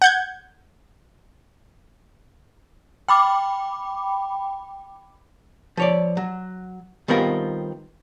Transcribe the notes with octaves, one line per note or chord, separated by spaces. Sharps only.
F#5 G6 G#6
G5 B5 D6
F3 C#5 D5
F#3
D#3 G3 B3 C4 F4 A#4